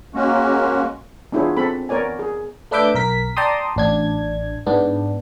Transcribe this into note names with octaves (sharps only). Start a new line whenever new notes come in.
G#3 A#3 C#4 F#4
B3 D4 E4 F4 G#4 C#5
C4 A4 B5
B3 A#4 C#5 D5 G#5
G#4
A3 D4 B4 E5 D6 G6
B1 A#4 B6
D5 G5 A5 A#5 C6 D#6
A1 D4 G#6
G#2 B3 D4